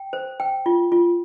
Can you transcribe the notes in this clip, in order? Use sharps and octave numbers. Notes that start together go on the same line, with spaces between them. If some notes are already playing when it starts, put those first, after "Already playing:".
Already playing: G5
C5
G5
F4
F4